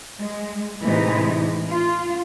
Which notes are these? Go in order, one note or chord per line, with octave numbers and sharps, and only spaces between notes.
G#3
A2 C3 E3 G#3 D#4
F4